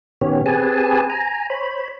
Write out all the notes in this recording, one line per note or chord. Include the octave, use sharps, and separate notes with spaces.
B2 D#3 B3 C#4 G4 C#5
C4 G4 G#4 B4 G#5 A5
G#5 A#5
C5 C#5 B5